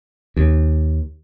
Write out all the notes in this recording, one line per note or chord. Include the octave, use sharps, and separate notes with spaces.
D#2